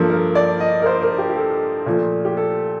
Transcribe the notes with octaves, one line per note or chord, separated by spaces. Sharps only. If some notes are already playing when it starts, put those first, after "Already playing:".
Already playing: G2 F3 A#3 A4
A#4
D5
D#5
A#4
C5
A#4
G4
G4
A4
A#2 F3 A3
G4
A4